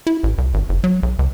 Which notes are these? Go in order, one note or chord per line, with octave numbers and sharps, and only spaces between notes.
E4
A1
C2
G#1
F#1
F#3
B1
C#2